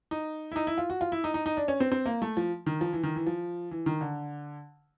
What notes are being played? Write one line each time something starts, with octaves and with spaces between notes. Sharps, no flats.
D#4
E4
D#4
E4
F4
F#4
F4
E4
D#4
D#4
D#4
D4
C#4
C4
C4
A#3
A3
F3
D#3
F3
E3
D#3
E3
F3
E3
D#3
D3